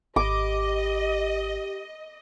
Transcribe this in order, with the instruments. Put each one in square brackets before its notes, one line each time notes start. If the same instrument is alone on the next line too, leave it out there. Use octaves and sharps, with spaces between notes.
[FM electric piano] G#1 [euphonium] G4 [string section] D#5 [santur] D6